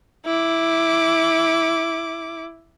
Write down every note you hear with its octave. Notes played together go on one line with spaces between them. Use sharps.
E4 D6